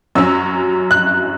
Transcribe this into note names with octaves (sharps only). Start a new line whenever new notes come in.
F#2 F#3 C#4 E6
F#6